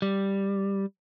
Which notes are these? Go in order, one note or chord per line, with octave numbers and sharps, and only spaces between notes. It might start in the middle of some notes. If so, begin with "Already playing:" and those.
G3